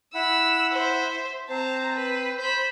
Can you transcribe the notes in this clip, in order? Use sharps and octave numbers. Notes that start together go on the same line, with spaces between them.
E4 F#5 B5 E6
C5 E5
C4 C5 A5 A#5
B4
C5 B5 G6